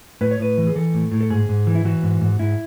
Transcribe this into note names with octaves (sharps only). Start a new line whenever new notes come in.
A2 B4
C#5
A2 B4
E3
G#4
E3 A4
A2
A2
A4
G#2 G#4
G#2
E3
E4
E3 F#4
G#2
G#2
G#2 E4